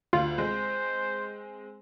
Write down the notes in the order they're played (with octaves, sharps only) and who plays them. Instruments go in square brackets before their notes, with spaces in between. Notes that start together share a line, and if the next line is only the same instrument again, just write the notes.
[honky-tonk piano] D2 [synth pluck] F4
[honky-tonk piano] G#3 C4 [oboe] C5